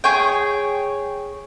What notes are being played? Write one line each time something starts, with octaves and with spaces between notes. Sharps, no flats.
G#4 C#5 G5